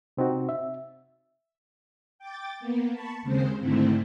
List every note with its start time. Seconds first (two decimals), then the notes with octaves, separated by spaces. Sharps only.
0.17 C3 C4 D#4 F#4
0.49 E5
2.19 G5 D6 A6
2.60 A#3 B3
2.92 A5 B5 C#6
3.22 D#2 C#3 G#3 C4 C5
3.60 G#2 D3 D#3 A3 C4 E4